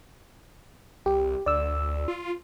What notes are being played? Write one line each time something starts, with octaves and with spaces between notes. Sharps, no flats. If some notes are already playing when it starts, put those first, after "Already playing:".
C2 G4
D2 D5 E6
F4